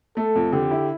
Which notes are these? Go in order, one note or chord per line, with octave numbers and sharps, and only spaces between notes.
A3 A4
F2
D3 G4
E4